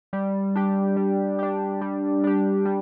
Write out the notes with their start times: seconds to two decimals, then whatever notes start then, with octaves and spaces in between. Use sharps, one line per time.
0.13 G3
0.56 D4 G4
0.97 G3
1.39 D4 G4
1.81 G3
2.24 D4 G4
2.65 G3